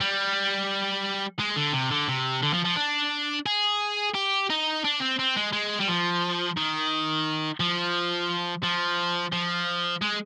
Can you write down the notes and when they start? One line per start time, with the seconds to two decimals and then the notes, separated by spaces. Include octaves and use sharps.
0.01 G3
1.39 G#3
1.56 D3
1.73 C3
1.91 D3
2.08 C3
2.43 D3
2.53 F3
2.65 F3
2.76 D4
3.46 G#4
4.14 G4
4.50 D#4
4.84 D4
5.01 C4
5.19 C4
5.36 G#3
5.53 G#3
5.80 G3
5.87 F3
6.57 D#3
7.60 F3
8.63 F3
9.33 F3
10.02 G#3